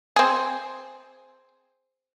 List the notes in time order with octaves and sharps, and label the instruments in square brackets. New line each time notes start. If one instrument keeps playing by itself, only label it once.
[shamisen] C4 G#4